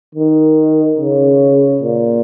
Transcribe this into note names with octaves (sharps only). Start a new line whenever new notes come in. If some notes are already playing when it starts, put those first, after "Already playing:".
D#3
C#3
A#2